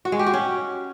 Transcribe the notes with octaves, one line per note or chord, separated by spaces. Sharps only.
F#4
G#3
G4
F#4
C#4